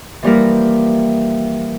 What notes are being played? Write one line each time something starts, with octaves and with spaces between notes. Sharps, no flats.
E3 F3 G3 A#3 E4 A#4